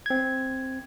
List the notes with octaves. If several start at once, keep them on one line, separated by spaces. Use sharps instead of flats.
C4 G#6